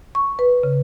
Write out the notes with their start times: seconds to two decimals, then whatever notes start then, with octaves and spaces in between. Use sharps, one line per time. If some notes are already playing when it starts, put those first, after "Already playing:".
0.15 C#6
0.39 B4
0.63 C#3